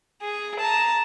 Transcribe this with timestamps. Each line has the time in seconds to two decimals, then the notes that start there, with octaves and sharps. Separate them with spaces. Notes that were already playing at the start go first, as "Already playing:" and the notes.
0.22 G#4
0.59 A5 A#5